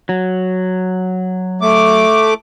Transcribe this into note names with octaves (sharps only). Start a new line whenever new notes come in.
F#3
A3 D6